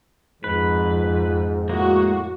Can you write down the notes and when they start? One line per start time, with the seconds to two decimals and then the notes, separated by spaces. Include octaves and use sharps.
0.44 F2 G#2 B4
1.69 A2 G#3 A#3 F#4